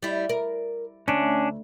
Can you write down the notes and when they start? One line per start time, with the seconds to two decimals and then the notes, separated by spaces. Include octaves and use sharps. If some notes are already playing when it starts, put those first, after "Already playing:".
0.03 G3 E4
0.29 A#4
1.08 D2 C#4 D4